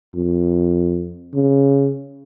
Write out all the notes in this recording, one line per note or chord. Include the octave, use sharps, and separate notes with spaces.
F2
C#3